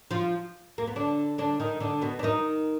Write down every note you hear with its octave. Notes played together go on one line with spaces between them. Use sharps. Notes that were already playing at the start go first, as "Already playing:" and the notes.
F3 F4
A#3
B3
D3 D4
D3 D4
D#3 D#4
D3 D4
B2 B3
D4
D#3 D#4